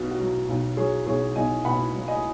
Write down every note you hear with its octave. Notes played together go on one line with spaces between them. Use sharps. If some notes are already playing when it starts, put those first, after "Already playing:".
Already playing: B1 B2 F#4
F#4
F#3
B1
F#3 G#4 C#5
B1 G#4 C#5
B1 D#5 G#5
B2 F#5 B5
F#3
D#5 G#5